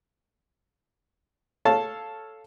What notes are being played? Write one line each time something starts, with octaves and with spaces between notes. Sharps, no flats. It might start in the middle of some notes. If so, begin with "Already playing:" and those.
A4 C#5 F5 A5